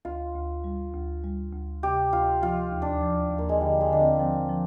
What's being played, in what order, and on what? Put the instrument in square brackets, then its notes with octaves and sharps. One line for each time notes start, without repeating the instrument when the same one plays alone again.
[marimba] D2 [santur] F4
[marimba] D2
G3
D2
G3
D2
[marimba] C3 [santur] G4
[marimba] D2 [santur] F4
[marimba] F3 [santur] F4
[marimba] D#2
[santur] D4
[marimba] F3
D#2
[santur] A#3
G#3
[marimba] D3 [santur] G3
[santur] G#3
[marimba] D3 [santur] D4
[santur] C4
[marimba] F3 [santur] C4
[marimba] F3